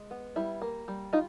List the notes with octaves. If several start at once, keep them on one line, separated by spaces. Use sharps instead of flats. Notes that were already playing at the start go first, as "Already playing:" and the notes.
Already playing: G#3
B3
G3 E4
A#3
G3
D#4 F4